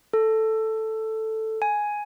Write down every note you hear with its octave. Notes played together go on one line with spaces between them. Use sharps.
A4
G#5